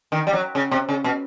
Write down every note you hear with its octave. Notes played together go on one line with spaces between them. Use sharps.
D#3
G3
F#3
C#3
C3
C#3
B2